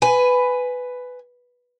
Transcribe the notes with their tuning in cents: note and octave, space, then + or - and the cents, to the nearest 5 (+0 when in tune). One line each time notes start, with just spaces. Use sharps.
B4 +10 G#5 +5